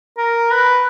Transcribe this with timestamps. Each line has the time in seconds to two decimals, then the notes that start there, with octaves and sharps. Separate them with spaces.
0.18 A#4
0.51 B4